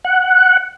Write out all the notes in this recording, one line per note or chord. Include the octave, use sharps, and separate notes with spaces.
F#5